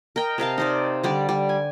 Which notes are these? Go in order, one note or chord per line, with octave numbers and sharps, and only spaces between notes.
A#4 D#5 G5
C3 A#4 F5 A5
D#4 C5 D5
D3 G3 D5
G3
G#5